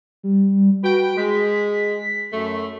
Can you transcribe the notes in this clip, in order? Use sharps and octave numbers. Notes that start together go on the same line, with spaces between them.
G3
F#4 B4 G5
G#3 B6
F#2 A3